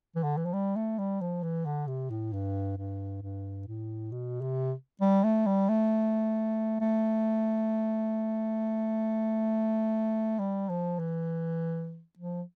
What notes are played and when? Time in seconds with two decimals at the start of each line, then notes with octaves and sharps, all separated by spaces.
0.16 E3
0.23 D3
0.37 E3
0.45 F3
0.53 G3
0.76 A3
0.99 G3
1.21 F3
1.43 E3
1.65 D3
1.87 C3
2.10 A2
2.33 G2
2.78 G2
3.22 G2
3.68 A2
4.12 B2
4.41 C3
5.01 G3
5.24 A3
5.46 G3
5.69 A3
6.81 A3
10.39 G3
10.69 F3
10.99 E3
12.19 F3